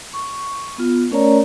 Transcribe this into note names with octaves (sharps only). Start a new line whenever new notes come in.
C#6
B3 F4
A3 C#4 A#4 C#5 D5 A#5